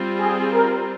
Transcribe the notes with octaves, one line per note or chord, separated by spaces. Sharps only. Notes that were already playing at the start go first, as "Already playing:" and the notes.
Already playing: G3 C4 F4
G#4
A#4